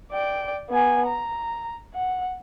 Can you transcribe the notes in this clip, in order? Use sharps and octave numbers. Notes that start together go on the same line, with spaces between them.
D5 G5
B3 G#5
A#5
F#5